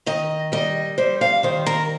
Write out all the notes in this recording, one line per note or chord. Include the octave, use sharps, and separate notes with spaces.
D#3 D#5
G3 D#5
G3 C5
F5
D#3 C5
A#4